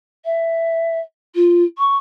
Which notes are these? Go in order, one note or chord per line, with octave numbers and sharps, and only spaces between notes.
E5
F4
C#6